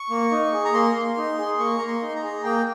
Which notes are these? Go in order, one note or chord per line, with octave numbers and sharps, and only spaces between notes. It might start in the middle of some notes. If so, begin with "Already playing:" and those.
Already playing: C#6
A#3
D#4
G#4
A#5
A#3 C6
A#3
D#4
G#4
A#3 C#6
A#3 A#5
C6
D#4
A#5
G#4
A#3 G5